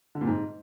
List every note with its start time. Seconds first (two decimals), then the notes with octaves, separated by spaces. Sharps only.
0.15 D3
0.21 A#2
0.27 G#2